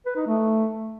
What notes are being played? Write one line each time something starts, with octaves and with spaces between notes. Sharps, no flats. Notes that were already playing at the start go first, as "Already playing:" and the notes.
B4
D#4
A3